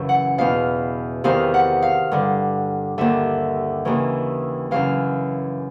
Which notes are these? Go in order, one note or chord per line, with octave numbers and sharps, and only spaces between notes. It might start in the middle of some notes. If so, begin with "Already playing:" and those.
Already playing: F#2 C#3 E3
F#5
E2 B2 F5
E2 C3 D#3 F5
F#5
F5
G2 D3
D#2 D3 E5
D#2 C#3 E3
F#2 C#3 E3 F5